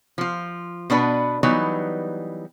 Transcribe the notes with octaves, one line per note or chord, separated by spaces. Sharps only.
F3 F4
B2 B3 D4 B4
E3 F#3 G3 B3 D#4